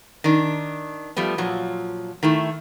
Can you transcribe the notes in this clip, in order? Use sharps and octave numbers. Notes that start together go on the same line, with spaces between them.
D#3 D4
F3 G3 A3 B3
A#2 F3 F#3
D#3 A3 E4